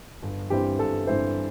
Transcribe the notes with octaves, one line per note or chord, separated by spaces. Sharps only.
G1
G2 E3 C4 E4 G4
G1 A4
G2 E3 C4 E4 C5